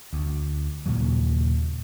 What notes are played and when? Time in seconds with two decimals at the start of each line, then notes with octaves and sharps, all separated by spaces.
0.13 D2
0.86 D#2 A#2 C#3 F#3